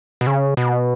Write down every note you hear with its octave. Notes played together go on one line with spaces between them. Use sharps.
B2
C#3
B2